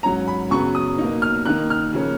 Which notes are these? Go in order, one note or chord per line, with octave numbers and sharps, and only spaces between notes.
G#2 F#3 C#4 A#5
B5
F#2 C#3 F#3 B3 C#6
D#6
B2 A#3 D#4
F6
D#3 A#3 D#4 F#6
F6
C#3 F3 A#3 C#4